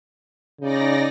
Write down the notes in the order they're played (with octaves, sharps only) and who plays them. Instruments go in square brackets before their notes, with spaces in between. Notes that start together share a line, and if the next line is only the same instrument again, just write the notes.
[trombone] C#3 [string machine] D#4 D5 A#6